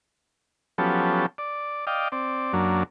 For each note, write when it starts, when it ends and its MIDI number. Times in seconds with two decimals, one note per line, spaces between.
0.78 1.26 53
0.78 1.26 54
0.78 1.26 59
0.78 1.26 61
0.78 1.26 67
0.78 1.26 69
1.38 1.85 74
1.87 2.08 74
1.87 2.08 75
1.87 2.08 77
1.87 2.08 79
2.12 2.53 60
2.12 2.53 74
2.53 2.83 42
2.53 2.83 54
2.53 2.83 58
2.53 2.83 62